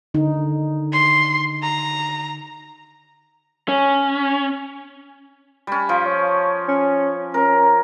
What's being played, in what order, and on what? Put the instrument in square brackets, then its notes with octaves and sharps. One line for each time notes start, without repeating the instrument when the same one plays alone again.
[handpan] D3 D#4
[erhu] C6
A#5
[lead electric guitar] C#4
[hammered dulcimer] G3 C#4
[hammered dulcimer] F3 [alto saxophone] F5
[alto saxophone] C#5
C#4
[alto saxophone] C#4 [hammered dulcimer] A#4